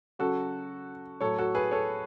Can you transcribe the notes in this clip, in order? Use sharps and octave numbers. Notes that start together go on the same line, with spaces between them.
C#3 F#3 F#4 A4
A2 F#3 A4 C#5
F#4 A4
G#4 B4
A4 C#5